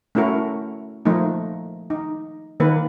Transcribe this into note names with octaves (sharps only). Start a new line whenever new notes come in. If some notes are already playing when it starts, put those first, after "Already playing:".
A3 C#4 E4 F#4 A#4
F3 A3 A#3 D#4
D#4
D#3 A#3 B4